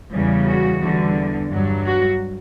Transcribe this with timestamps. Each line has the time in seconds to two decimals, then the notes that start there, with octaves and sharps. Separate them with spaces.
0.12 E2 C#3 G3
0.47 F#4
0.80 E2 D3 G3
1.50 G2 F#3
1.85 F#4